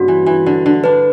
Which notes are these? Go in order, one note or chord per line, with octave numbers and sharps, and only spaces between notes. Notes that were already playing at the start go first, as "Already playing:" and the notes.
Already playing: G2 C#3 A#3 F#4
E3
E3
D3
D3
D4 B4